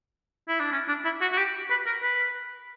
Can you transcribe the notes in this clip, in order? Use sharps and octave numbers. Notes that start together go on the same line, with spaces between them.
E4
D4
C#4
D4
E4
F#4
F#4
G4
B4
A#4
B4